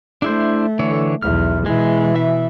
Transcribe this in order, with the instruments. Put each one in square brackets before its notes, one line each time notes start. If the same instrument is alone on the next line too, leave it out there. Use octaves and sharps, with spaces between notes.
[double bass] A3 [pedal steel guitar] D4 E4 C5
[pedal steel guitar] D3 E3 C#5
[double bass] B1 E2 [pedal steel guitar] F6
[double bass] B2 E3 [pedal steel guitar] G#3
[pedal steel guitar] E5